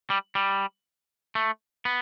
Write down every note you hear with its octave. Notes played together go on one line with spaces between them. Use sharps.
G3
G3
A3
B3